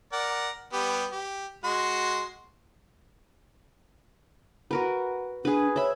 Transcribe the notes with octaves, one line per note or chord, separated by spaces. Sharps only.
A#4 D5 F#5
G3 B3 G4
G4
G#3 F#4 C6
F#4 A#4 B4
D4 G#4 B4
C#5 E5 B5